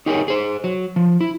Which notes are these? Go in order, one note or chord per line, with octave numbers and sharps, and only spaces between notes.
D#4 G4 G#4 A#4 C5 C#5
G#4 C5
F#3
F3
E4